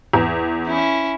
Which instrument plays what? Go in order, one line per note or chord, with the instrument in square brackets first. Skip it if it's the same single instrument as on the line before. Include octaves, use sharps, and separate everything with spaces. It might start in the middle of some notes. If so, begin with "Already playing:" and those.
[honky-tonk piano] E2
[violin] C#4 E4